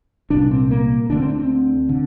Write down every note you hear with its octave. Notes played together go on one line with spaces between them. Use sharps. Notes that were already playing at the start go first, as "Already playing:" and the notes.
C2 A#2 D4
C4
A#3
D2 D3 D4
C4
D4
C4
D3